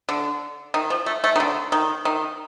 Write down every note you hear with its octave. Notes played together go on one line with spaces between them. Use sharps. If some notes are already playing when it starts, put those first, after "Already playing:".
D3
D#3
F3
A3
A3
D#3
D3
D#3
D#3